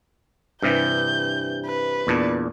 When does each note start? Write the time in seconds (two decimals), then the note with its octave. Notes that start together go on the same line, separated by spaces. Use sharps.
0.62 G2 C3 E3 G6
1.66 B4
2.07 E2 A#2 D4